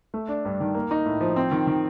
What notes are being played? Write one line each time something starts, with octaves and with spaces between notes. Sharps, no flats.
A3
D4
G2
D#3
A#3
D#4
A2
F3
C4
D#3
D#3